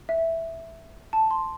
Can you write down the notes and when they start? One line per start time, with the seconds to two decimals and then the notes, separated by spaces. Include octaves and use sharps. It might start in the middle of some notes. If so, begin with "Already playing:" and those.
0.09 E5
1.13 A5
1.31 C6